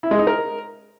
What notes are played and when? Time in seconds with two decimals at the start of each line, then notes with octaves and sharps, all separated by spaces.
0.03 E4
0.11 G#3
0.19 D#4
0.27 A#4